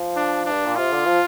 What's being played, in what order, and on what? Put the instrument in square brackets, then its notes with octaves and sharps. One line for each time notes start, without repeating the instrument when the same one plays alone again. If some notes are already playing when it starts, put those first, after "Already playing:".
Already playing: [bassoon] F3
[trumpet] D4
D4
[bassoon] G2
A#2
[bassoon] C3 [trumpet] F4
[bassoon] D3
F3